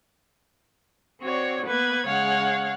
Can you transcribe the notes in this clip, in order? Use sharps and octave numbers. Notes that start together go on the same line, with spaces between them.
C4 F#4 C#5 D5
A#3 B3 B4 G#6
C#3 G#3 C#5 F5 F#5